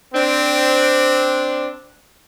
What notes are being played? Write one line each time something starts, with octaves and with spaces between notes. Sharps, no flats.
C4 D4